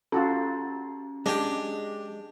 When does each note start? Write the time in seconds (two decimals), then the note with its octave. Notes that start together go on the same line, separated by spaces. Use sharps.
0.12 C#4 F4 F#4 A4
1.26 G#3 D4 G4